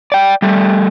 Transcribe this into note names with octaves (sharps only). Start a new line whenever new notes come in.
D5 G5
G3 A3